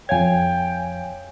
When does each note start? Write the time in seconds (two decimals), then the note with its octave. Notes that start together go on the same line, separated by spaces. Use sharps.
0.09 F2 C#5 F5 G5 G#5 G#6